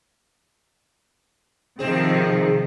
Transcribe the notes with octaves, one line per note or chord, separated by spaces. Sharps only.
C3 D#3 F3 C4 G#4